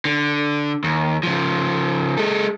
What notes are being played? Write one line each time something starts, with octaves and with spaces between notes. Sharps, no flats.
D3
D#2
C#3 F3
G#3 A4